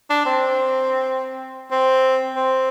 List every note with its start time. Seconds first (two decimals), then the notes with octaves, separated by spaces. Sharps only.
0.10 D4
0.26 C4
1.71 C4
2.35 C4